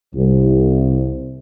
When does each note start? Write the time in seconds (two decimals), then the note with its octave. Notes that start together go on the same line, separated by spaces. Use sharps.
0.15 C2